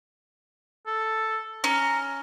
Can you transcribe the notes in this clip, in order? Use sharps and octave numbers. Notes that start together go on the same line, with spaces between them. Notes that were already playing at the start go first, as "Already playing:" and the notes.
A4
C#4 A#5